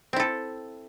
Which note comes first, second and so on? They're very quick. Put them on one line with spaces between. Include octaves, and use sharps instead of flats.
C4 E4 A4